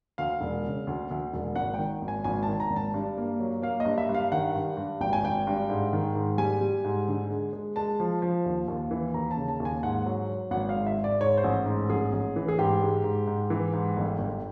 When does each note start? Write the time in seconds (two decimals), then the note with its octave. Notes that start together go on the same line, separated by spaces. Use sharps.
0.18 D2 F5
0.41 E1
0.65 C#3
0.87 D2
1.10 D2
1.33 E1
1.56 G#1 F#5
1.74 D#3 G5
2.02 G#1
2.08 G#5
2.24 G#1 G#5
2.43 A5
2.48 D#3
2.60 A#5
2.71 G#1
2.76 A5
2.94 G2
3.17 A#3
3.40 F#3
3.62 A#3 F5
3.80 D#5
3.85 G2
3.98 E5
4.09 G2
4.15 F5
4.32 D#3 F#5
4.55 G2
4.77 G2
5.01 G#1 G5
5.13 G#5
5.23 G#1 G5
5.47 G2
5.70 G#2
5.93 D#3
6.15 G#2
6.38 G3 G#5
6.61 G3
6.84 G#2
7.08 D3
7.30 G#3
7.53 G#3
7.76 G#3 A5
8.00 F3
8.22 F3
8.45 D#2
8.68 D#2
8.91 E3
9.14 D#2 A#5
9.31 A5
9.37 C#3
9.48 A5
9.60 D#2
9.65 G#5
9.83 G#2 F#5
10.06 F#3
10.29 F#3
10.51 G#1 F#5
10.69 F5
10.75 G#2
10.87 E5
10.97 G#2
11.04 D5
11.21 G#2 C#5
11.37 C5
11.44 A1
11.66 G#2
11.90 A1 G#4
12.13 A1
12.36 E3
12.48 G#4
12.58 G#2 G4
12.82 G#3
13.04 G#2
13.27 G#2
13.50 E3
13.73 G#2
13.97 G1
14.19 G1